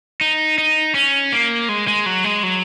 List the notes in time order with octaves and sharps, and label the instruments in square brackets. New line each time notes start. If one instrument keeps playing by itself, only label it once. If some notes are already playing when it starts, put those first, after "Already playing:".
[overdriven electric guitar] D#4
D#4
C#4
A#3
G#3
G#3
F#3
G#3
F#3